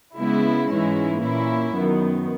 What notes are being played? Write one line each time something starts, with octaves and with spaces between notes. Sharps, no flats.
C#3 G#3 B3 E4
G#2 E3 G#3 C#4 E4
A#2 A#3 C#4 E4
F#2 D#3 F#3 B3